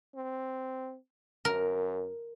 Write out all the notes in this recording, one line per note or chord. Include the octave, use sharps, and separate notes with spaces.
C4
F#2 A#4